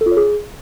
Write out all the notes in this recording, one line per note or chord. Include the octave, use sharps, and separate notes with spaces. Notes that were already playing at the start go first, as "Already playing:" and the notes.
A4
F4
C#5
G#4